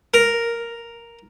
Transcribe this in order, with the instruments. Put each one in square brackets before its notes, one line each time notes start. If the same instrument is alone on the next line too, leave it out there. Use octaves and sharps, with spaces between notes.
[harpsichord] A#4